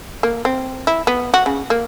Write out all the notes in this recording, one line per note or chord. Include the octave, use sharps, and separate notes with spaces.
A#3
C4
E4
B3
F#4
C#3
A#3